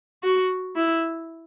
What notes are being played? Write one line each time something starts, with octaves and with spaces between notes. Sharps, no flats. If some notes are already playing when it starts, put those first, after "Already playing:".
F#4
E4